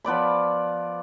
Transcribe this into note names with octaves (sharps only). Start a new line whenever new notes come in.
F3 B3 D5 B5